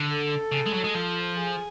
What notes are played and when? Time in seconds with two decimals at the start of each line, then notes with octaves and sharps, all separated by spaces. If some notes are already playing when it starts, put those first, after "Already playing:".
Already playing: D3
0.09 A4
0.52 C#3
0.66 G#3
0.74 F#3
0.84 G#3
0.95 F3
1.37 G#4